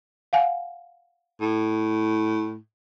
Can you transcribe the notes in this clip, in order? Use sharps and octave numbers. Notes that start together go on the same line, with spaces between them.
F5 F#5 G#5
A2